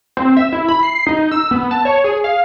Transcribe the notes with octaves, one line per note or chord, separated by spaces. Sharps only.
C4
E5
E4
B5
C7
D#4
E6
B3
A5
C#5
G#4
F5